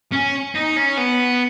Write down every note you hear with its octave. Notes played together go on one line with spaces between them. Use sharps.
C#4
D#4
C#4
B3